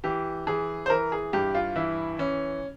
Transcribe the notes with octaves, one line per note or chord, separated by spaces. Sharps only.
E3 G4
E3 G#4
C5
E3 A#4
G#4
G2 G4
F4
E3 E4
E3 C#4